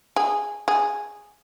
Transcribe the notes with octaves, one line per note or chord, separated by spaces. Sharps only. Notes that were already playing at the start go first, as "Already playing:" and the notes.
G#4
G#4